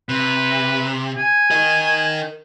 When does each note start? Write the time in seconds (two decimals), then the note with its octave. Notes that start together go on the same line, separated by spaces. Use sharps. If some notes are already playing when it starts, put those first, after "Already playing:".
0.09 C3 B4
1.17 G#5
1.51 A#4 D#5